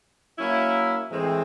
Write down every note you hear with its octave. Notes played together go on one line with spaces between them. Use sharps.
F#3 A#3 C#4 E4
A2 E3 G#3 C4